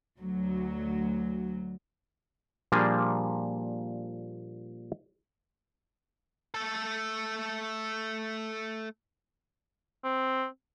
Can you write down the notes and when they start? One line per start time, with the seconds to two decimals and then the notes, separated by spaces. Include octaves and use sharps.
0.18 D2 F#3
2.72 A#2 F3 G3 A#3 D4 G#4
6.54 A3 A4
10.04 C4